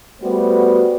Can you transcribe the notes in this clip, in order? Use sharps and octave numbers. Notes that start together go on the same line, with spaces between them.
G3 A3 B3 F#4 C5